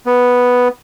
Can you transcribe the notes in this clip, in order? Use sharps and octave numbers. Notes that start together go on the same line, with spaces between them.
B3